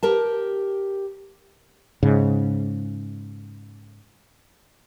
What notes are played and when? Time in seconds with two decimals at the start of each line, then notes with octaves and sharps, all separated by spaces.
0.03 G4 A#4 A5
2.03 G#2 C#3